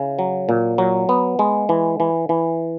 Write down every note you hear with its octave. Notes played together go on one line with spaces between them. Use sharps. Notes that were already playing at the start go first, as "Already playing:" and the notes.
Already playing: C#3 E4
F#3
A#2
F#3
B3
G#3
E3
E3
E3